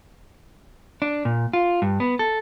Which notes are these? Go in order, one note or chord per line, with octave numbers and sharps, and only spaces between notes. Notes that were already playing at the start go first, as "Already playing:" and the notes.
D4
A#2
F4
G2
B3
A4